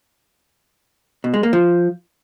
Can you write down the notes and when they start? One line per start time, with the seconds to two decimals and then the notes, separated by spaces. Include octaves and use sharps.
1.24 B2
1.34 G#3
1.43 A#3
1.53 F3